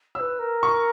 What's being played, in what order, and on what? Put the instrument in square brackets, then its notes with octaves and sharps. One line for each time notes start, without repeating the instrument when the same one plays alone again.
[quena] C#5 [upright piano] E6
[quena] B4
A#4
[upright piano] C#6